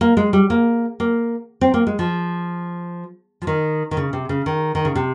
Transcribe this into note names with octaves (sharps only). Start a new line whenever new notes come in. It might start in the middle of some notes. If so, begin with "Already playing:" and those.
A#3
G#3
G3
A#3
A#3
C4
A#3
G#3
F3
F3
D#3
D#3
C#3
C3
C#3
D#3
D#3
C#3
C3